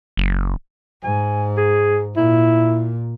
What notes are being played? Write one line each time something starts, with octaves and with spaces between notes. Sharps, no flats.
F#1
G#2 G#5
G#4
A#2 E4